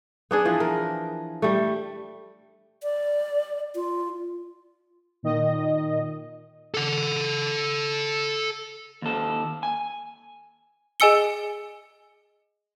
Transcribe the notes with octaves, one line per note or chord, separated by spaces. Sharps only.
B3 D4 G#4
E3 F3
A#4
G3 A3
D5
F4
A#2 D#3 D#5
A4 F#5
D#2 A4
G#5
G#4 D#5 G#5 E6 C#7 G7